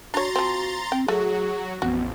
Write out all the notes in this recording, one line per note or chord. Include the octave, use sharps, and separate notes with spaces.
D4 F#4 C#5 A#5 C6 A6
F3 C4
C4 G5
F#3 A3 F#4 G#4
A1 F2 B3 F#4